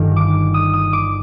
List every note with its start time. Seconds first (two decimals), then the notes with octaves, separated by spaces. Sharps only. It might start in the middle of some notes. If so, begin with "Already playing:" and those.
Already playing: G1 G2 D#3
0.16 D6
0.54 D#6
0.74 D#6
0.93 D6